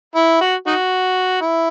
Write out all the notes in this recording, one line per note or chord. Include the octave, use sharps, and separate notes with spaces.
E4
F#4
D#4 F#4
E4